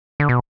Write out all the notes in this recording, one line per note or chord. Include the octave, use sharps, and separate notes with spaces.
D3
B2